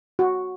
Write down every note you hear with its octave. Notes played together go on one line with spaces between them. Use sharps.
F#4